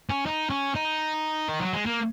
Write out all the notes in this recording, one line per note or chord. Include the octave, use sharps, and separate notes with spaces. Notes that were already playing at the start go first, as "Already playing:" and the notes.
C#4
D#4
C#4
D#4
D#3
F#3
G#3
A#3